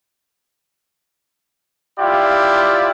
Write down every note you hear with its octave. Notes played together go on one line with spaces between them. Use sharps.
E4 F4 G4 D5